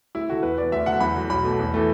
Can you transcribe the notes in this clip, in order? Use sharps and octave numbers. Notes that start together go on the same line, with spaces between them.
D2 E4
D3 A3 F#4
E2 B4
E3 B3 D5
D2 E5
D3 F#3 F#5
E2 B5
D3 F#3
B1 B5
B2 A3
E2
E3 A3